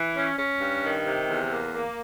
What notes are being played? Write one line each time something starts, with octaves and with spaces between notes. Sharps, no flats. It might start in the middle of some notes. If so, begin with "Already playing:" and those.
Already playing: E3
C#4
C#4
G2
D#3
C3
E2
A#3
A#3